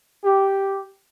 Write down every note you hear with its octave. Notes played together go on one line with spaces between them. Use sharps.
G4